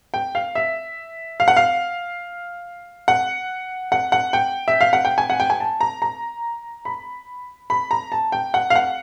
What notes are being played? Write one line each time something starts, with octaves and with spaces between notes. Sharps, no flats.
G5
F5
E5
F5
F#5
F5
F#5
F#5
F#5
G5
E5
F5
F#5
G5
G#5
F#5
G5
G#5
A5
A#5
A#5
B5
B5
A#5
A5
G5
F#5
F5
F#5